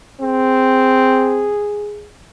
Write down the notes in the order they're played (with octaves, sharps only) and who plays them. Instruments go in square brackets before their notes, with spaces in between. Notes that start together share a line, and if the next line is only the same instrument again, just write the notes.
[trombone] C4 [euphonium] G#4